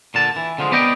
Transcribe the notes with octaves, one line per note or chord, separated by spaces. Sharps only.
A#2 D3 A5
E3
D3 F3 G#3
B3 D5 D#5 G5